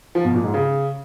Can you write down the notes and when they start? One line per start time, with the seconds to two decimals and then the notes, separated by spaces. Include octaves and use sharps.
0.15 F3
0.25 B2
0.34 A#2
0.44 G#2
0.54 C#3